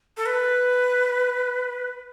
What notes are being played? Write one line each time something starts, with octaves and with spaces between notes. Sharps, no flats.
A4
B4